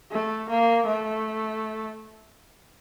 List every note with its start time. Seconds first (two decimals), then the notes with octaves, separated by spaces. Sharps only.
0.11 A3
0.49 A#3
0.86 A3